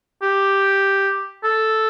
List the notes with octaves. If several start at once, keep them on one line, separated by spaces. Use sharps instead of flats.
G4
A4